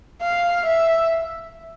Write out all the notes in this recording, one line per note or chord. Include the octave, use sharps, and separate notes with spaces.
F5
E5